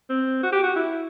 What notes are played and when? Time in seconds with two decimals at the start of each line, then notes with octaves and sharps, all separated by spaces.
0.09 C4
0.43 F#4
0.52 G4
0.63 F#4
0.76 E4